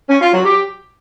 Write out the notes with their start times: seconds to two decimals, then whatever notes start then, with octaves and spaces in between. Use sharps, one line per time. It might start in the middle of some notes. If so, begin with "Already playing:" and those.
0.09 C#4
0.20 F4
0.32 F#3
0.43 G4